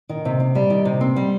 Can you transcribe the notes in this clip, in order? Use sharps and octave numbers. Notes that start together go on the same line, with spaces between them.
D#3
C3
C4
G3
D#3
C3
C4
G3